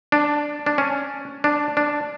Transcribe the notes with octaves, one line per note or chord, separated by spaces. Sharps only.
D4
D4
C#4
D4
D4